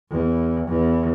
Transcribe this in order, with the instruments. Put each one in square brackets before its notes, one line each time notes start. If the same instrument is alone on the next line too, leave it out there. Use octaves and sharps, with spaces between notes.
[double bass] E2
E2